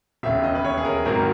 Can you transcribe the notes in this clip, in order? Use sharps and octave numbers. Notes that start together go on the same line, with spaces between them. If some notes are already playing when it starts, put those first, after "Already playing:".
E1 D#2 C#3 E5
D#5
B4
C#5
G#4
A#4
G#1 G#2 D#3 F#3 A#4